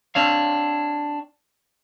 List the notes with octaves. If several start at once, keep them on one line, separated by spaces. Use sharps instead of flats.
C4 D4 C#5 F5